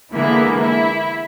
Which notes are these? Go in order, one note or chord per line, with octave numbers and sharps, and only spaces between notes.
D3 E3 G#3 A#3 B3 E4
E4